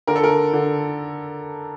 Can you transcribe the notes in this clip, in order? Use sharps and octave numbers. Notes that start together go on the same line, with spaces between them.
D3 A#4
A4
A#4
D3
D3